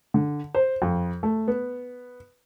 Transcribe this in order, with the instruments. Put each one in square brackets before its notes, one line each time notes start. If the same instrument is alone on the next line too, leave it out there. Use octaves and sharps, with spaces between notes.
[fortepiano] D3
C5
F2
A3
B3